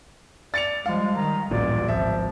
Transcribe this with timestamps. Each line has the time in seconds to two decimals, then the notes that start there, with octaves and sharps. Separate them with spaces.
0.54 D5 A6 C#7 F7
0.86 F3 G3 G#3 F5
1.17 D#3 A#5
1.51 D1 A1 G2 A#2 D5
1.88 G#1 C#2 F3 E5